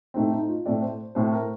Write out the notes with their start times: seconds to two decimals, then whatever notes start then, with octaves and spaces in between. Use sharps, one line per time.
0.14 A2 A3 C4 D#4
0.31 D#4
0.48 F4
0.65 A2 A3 C4 D5
0.82 C5
1.15 A2 A3 C4 C5
1.32 A#4